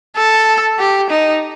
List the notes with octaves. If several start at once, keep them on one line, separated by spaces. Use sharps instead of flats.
A4
G4
D#4